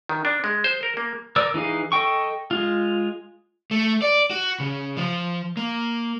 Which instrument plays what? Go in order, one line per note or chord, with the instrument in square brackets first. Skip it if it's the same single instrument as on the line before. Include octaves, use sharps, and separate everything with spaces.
[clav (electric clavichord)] D#3
D4
G#3
C5
A#4
A#3
[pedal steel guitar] A#4 D5 E6
E3 D#4 G#4 F5
A4 D#5 G5 C#6
G#3 F4
[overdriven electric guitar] A3
D5
F#4
C#3
F3
A#3